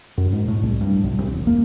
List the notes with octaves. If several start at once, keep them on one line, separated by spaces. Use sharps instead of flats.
F#2
G#2
A2
C2
G2
B1
C2
E1
A#3